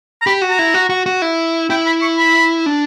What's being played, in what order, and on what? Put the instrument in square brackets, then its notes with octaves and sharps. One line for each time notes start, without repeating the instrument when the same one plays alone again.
[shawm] A#5
[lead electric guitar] G4 [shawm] B5
[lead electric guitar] F#4
[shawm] A#5
[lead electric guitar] E4
F#4
F#4
F#4
E4
[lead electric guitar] E4 [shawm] G5
[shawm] B5
C#6
B5
[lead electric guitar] D4